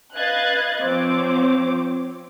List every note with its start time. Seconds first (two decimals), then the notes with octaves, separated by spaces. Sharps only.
0.15 B4 D#5 F5 F#6 G#6 A6
0.82 F3 C4 C#5 D6